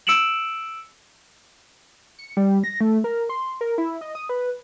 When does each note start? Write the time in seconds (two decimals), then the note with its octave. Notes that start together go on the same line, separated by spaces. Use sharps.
0.07 E6 C#7 D7 E7 F#7
2.18 C#7
2.37 G3
2.64 A#6
2.81 A3
3.04 A#4
3.29 C6
3.61 A#4
3.78 E4
4.01 D#5
4.15 D#6
4.29 B4